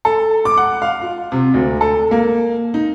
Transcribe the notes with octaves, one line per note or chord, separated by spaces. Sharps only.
A4
D6
F#5
F5
F4
C3
D2
A4
A#3
D#4